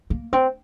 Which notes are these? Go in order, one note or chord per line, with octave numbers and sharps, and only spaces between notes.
A#3
C4